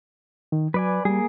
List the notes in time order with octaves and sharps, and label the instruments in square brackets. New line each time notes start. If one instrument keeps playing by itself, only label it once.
[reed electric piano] D#3
[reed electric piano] F#3 [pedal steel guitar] B4 D5 G#5
[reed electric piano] G3 [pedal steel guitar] A#3 G#4